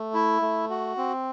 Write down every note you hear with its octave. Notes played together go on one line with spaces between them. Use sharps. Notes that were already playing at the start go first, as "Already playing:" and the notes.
Already playing: A3
E4
A3
F#4
C4